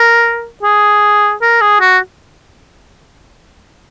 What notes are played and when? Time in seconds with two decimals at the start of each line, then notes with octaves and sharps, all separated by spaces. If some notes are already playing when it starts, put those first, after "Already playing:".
Already playing: A#4
0.63 G#4
1.42 A#4
1.61 G#4
1.80 F#4